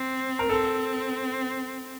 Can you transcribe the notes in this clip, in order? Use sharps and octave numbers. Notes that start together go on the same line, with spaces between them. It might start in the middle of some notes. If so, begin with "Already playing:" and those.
Already playing: C4
A#4
C4 A4